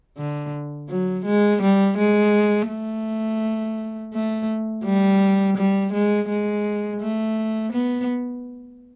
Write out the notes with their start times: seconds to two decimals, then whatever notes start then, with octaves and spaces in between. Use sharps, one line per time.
0.17 D3
0.89 F#3
1.25 G#3
1.62 G3
1.98 G#3
2.68 A3
4.13 A3
4.84 G3
5.57 G3
5.93 G#3
6.28 G#3
7.01 A3
7.72 B3